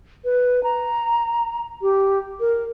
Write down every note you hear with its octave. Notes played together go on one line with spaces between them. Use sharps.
B4
A#5
G4
A#4